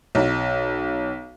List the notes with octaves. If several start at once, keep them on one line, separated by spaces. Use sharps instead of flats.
B1